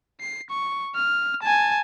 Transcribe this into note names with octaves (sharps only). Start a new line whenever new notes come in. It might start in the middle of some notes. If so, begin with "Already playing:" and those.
C7
C#6
F6
G#5 A5